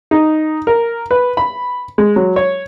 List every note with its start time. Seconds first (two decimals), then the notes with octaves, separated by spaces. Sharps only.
0.11 D#4
0.67 A#4
1.11 B4
1.37 B5
1.98 G#3
2.16 F#3
2.36 C#5